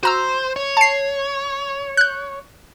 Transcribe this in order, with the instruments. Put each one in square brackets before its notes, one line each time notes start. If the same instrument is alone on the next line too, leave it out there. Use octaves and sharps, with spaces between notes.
[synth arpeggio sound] F#4 A#5 E6 [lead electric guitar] C5
[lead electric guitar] C#5
[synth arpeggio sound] A5 C7
F#6 G6